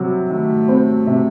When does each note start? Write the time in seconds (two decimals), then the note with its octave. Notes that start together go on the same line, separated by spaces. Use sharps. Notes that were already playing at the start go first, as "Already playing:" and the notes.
Already playing: C3 F#3
0.30 D#3 A3
0.68 C4
1.07 C3